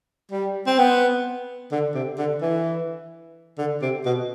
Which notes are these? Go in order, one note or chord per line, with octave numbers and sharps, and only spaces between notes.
G3
C4
B3
D3
C3
D3
E3
D3
C3
B2